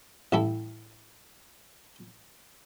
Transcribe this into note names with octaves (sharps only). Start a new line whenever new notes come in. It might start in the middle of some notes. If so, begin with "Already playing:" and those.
A1 G3 E4 A4